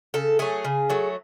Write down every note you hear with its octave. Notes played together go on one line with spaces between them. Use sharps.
C#3 A4
F#3 A3 G#4
C#3
F#3 A3